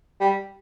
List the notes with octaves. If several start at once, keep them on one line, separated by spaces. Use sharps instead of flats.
G3